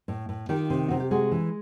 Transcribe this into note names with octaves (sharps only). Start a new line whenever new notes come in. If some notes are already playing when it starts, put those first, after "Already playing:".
A2
A2
D#3 F4 G4
C3
C3 F#4
G4
G#3 F#4 G#4
E3